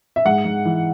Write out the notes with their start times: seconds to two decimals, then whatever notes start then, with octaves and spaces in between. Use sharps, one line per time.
0.16 E5
0.25 G#2 F#5
0.45 G#2
0.65 E3